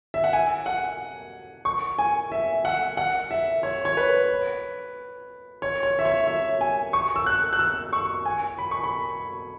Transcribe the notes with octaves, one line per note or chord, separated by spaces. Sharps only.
E5
F#5
G#5
F#5
C#6
G#5
E5
F#5
F#5
E5
C#5
C#5
B4
C#5
C#5
E5
C#5
E5
G#5
C#6
E6
F#6
F#6
E6
C#6
G#5
B5
C#6
B5